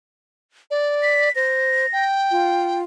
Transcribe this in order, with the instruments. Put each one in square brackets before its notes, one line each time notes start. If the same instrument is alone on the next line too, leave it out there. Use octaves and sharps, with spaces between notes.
[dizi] D5
[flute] B6
[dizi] C5 [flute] A#6
[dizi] G5
[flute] F4